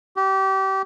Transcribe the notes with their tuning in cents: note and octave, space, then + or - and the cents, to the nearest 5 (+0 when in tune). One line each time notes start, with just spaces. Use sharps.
G4 -25